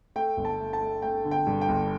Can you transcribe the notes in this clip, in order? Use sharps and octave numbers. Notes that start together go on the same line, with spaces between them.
A3 G5
G1
A5
A3
A5
A3
A3 G5
D3
G5
G2
G5
G1